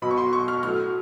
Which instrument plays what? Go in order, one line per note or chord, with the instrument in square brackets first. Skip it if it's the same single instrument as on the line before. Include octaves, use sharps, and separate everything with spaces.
[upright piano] B2 F#3 B5
C#6
C6
C#6
F6
A2 F#3 F6